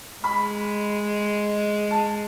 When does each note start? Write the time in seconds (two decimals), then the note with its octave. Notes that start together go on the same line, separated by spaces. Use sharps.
0.24 G#3 B5
1.91 A5